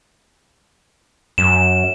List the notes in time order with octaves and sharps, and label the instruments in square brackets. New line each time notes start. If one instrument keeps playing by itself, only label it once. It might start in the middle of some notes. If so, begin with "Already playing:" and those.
[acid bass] F#2 [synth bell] E7